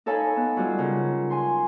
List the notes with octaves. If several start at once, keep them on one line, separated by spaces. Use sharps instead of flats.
D#4 A4 C#5 F5 G#5 B5
B3
F#3 G3 F4
C#3 A#4
G#5 C6